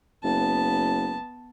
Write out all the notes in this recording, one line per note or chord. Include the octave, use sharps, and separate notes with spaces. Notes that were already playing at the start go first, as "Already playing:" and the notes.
F#1 B3 A5